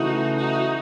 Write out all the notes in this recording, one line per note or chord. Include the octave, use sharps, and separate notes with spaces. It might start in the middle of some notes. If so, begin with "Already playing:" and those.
Already playing: C#3 E3 A3 D#4 E4 F#4
D#4 F#4